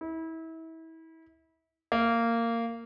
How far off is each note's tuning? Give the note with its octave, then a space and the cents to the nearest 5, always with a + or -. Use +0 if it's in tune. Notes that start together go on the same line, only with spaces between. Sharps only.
E4 -30
A#3 -15